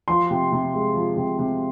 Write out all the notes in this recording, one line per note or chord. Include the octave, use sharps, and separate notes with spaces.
F3 C6
C3
C3
G#3
F3
C3
C3